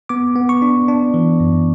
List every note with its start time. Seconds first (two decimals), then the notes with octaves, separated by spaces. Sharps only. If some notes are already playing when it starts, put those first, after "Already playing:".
0.09 B3 D6
0.36 B3
0.49 C#6
0.62 D4
0.88 D4
1.14 E3
1.40 F#2